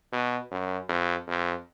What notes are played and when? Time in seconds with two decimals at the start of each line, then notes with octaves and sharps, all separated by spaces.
0.13 B2
0.51 F#2
0.89 F2
1.27 F2